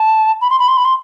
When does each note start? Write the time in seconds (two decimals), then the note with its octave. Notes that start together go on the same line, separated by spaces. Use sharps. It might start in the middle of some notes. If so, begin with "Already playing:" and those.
Already playing: A5
0.41 B5
0.50 C6
0.59 B5
0.68 C6
0.77 B5
0.85 C6